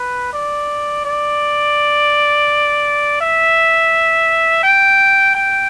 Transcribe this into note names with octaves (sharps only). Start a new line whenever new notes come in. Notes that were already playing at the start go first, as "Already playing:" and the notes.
Already playing: B4
D5
D5
E5
G5
G5